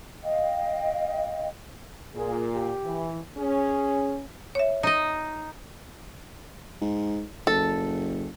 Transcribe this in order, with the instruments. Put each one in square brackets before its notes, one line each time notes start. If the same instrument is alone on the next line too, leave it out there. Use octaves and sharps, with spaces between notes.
[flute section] D#5 F5 G5
[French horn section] A#2 [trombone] G#4
[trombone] G4
[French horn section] E3
[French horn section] C#4 [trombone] G#4
[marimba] C#5 E5
[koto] D#4 D#5
[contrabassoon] G#2
[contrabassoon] F#1 [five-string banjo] A4